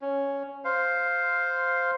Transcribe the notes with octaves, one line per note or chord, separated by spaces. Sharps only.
C#4
C5 F5